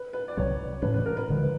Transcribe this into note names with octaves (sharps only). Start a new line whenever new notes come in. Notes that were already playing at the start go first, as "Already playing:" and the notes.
Already playing: B4
B4
D5
C2 C3 D#3 F#3 C#5
A2 E3 A3 C#4 B4
B4
A#4
B4
D2 D3 F3 G#3